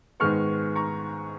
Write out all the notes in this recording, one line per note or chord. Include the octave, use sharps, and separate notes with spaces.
G#2 D#3 G#3 B3 C#6 F6
A#5 C#6